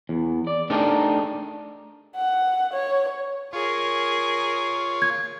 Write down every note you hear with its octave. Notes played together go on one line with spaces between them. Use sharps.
E2
D5
A3 D4 D#4 G4 G#4 A#4
F#5
C#5
F4 G#4 A#4 C#5
G#6